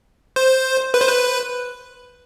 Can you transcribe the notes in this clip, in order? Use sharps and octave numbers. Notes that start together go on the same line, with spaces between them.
C5
B4
C5
B4